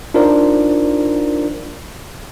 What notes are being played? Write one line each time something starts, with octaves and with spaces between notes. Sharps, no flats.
D4 D#4 F4 A#4 C5 D5